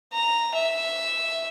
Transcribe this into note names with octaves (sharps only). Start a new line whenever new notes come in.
A#5
E5